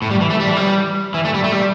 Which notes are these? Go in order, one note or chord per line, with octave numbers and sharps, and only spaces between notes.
A2
G3
E3
A3
G3
E3
G3
E3
A3
G3
A3
G3